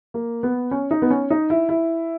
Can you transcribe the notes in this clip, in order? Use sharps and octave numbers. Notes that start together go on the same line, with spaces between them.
A#3
B3
C#4
D#4
B3
C#4
D#4
E4
E4